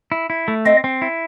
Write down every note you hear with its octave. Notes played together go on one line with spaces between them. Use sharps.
E4
E4
A3
C4 D#5
C4
E4